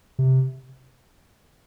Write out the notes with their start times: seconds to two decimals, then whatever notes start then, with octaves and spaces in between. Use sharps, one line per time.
0.19 C3